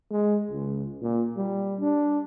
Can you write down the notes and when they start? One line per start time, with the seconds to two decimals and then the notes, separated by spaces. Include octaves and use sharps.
0.11 G#3
0.51 C#2
1.02 A#2
1.37 G3
1.81 D4